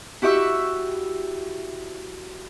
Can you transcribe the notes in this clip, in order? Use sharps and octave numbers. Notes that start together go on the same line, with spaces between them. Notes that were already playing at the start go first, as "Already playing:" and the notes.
E4 F#4 G4 E5 C#6 E6